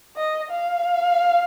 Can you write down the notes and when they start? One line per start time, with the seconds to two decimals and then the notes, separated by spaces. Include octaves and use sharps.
0.17 D#5
0.51 F5